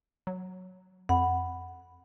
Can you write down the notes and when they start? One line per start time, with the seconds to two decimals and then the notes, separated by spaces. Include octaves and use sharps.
0.27 F#3
1.09 F2 F#5 B5